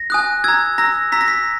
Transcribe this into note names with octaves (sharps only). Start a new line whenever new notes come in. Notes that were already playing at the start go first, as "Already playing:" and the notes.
Already playing: A#6
G#5 D#6 F#6
A#5 E6 G#6
A#5 E6 A#6
A#5 E6 B6
A#6
B6